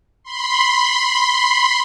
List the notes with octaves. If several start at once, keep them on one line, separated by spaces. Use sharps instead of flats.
B5 C6